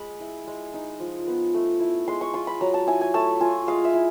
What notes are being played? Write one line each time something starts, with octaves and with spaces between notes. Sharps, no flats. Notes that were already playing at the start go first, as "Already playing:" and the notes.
Already playing: G#3 B5
E4
G#3
D#4
F3
B3
A3
E4
G#3 C6
C#6
F4 C6
B5
F#3 A#5
A5
E4 G#5
G#5
A3 A5
F4 G#5
G#3 F5
E5
E4